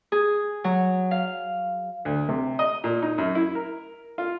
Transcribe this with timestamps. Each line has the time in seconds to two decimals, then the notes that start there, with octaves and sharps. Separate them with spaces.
0.12 G#4
0.64 F#3
1.11 F5
2.05 D2
2.29 C3
2.59 D#5
2.84 A#2
3.02 D#4
3.18 F#2
3.35 E4
3.55 A#4
4.18 F4